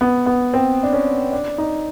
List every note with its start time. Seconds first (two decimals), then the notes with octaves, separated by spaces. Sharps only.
0.01 B3
0.26 B3
0.54 C4
0.83 D4
0.93 C#4
1.33 D4
1.58 D#4